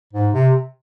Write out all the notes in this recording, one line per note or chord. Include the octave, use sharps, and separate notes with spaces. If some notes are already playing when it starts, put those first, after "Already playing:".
G#2
C3